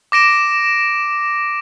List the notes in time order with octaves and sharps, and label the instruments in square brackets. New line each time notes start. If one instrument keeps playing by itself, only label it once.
[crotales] D6 A#6 D7 E7